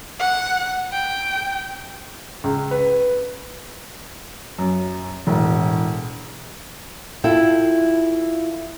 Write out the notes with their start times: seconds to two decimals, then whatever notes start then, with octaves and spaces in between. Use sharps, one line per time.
0.19 F#5
0.92 G5
2.44 C#2
2.71 B4
4.58 F#2
5.27 E1 A2
7.24 E4 F4 A4 G5